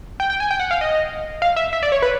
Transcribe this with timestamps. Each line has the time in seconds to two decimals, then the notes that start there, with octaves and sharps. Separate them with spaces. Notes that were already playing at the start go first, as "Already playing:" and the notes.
0.20 G5
0.30 G5
0.40 G#5
0.51 G5
0.60 F#5
0.71 F5
0.81 D#5
1.42 F5
1.56 E5
1.73 E5
1.83 D5
1.92 C#5
2.02 B4